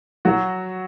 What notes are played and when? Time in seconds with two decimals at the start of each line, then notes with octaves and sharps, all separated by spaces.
0.25 F#3 F#4